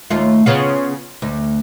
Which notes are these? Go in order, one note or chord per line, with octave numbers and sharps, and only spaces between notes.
D#2 A3 F4
C#3 B3 F4
D2